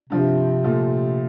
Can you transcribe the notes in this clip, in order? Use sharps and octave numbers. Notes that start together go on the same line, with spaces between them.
G2 C3 F3 C4
A#2 F3 A3